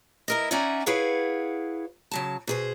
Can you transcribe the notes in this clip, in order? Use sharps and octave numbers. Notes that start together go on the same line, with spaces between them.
E4 A#4 D#5
C#4 D#4 D5 E5 F#5 G#5
E4 G#4 B4 C#5 F5 F#5
C#3 F#3 A5
B2 G#4 C5